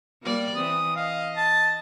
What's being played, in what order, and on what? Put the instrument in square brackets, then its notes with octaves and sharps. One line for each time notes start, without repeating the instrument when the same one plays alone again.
[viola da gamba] G3 A#3 D5
[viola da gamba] E3 C4 [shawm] D#6
[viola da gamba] D#5 [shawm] F5
[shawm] A5